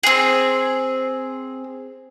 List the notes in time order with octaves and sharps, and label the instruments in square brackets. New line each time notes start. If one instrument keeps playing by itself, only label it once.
[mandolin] C4 G#4